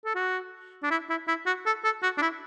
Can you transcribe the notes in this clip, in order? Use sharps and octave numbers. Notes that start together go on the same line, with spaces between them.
A4
F#4
D4
E4
E4
E4
F#4
A4
A4
F#4
D4
E4